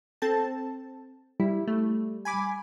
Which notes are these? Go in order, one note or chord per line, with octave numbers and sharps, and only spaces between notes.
C4 A4 A5
G3 E4
A3
G#5 B5 D6